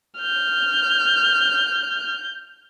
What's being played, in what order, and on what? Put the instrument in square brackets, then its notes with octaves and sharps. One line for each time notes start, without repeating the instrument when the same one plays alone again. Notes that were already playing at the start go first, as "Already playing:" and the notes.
[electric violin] F6 [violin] G6